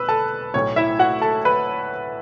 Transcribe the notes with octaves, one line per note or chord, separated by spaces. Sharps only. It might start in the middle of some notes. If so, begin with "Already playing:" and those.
Already playing: E1 E2 B4 B5 E6
A4 A5
B1 A2 F#3 C#5
E4 E5
F#4 F#5
A4 A5
B4 B5